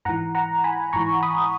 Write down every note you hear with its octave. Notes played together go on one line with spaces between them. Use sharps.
G#2 E3 F#5 A#5
F#5 A#5
G#5 B5
G#2 E3 A#5 C#6
B5 D#6